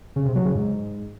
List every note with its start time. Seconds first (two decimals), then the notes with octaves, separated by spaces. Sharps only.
0.16 C#3
0.26 C3
0.35 F#3
0.45 C#3
0.55 G#2